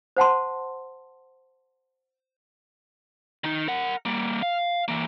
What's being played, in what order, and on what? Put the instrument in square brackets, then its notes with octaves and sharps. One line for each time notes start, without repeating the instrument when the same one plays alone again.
[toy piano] C5 F#5 A5 C6
[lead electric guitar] D#3 D#4
A#4 F#5
G3 A#3
F5
E3 A#3